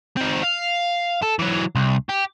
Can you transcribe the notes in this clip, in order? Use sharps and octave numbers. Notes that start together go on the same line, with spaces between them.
C4 D#4
F5
A4
E3 F#3
C2
G4